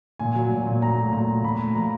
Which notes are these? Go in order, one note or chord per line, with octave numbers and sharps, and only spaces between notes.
A#2 G#5
F#3
A#2
A#2
F#3 A#5
A3
A#2 A#5
A3
A#2 B5
A3
F3 A#5